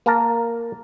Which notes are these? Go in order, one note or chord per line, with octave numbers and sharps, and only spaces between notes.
A#3 A#4 A5 A#5